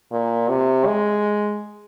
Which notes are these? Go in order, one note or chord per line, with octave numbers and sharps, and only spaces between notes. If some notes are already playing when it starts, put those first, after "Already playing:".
A#2
C3
G#3